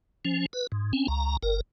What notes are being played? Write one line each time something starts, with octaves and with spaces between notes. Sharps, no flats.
F3 C#4
B4
G#2
C4 C#4
C#2 A#5
G1 A#4